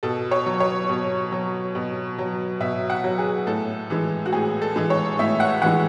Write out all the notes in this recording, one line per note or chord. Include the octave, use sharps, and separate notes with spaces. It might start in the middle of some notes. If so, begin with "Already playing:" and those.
B2 A4
C#5
F#3
C#5
B2
F#3
B2
F#3
B2 E5
F#5
F#3
G#4
A2 A4
E3 G#3
F#4
A2 G#4
A4
E3 G#3
C#5
A2 E5
F#5
E3 G#3 F#5